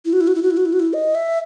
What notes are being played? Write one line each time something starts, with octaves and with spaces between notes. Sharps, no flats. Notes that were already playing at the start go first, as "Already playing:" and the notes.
E4
F#4
E4
F#4
E4
F#4
E4
F#4
E4
F#4
E4
D#5
E5